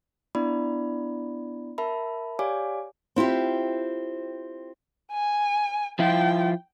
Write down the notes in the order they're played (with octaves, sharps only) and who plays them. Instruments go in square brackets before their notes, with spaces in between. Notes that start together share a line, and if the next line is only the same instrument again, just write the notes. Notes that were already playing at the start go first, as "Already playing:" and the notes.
[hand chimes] B3 D4 E4 D5 B5
A#4 E5 A5 B5
G4 C#5 D5 F5 G#5 D6
[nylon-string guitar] C4 E4 F4 G4
[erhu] G#5
[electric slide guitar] F3 E4 F4 [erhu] G5